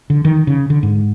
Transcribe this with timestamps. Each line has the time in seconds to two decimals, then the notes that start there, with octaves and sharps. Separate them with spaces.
0.10 D3
0.25 D#3
0.47 C#3
0.70 D3
0.83 G#2